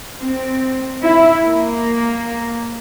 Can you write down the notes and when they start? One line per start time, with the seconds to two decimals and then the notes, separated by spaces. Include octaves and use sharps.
0.22 C4
1.03 E4
1.43 A#3